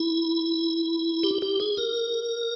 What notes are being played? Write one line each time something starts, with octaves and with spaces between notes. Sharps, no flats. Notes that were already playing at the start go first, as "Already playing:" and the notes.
Already playing: E4
G4
G4
G#4
A#4